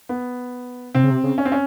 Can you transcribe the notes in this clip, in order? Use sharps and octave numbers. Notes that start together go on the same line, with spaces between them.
B3
C3 C4
C#3
C3
C#3
C#4
C4
C#4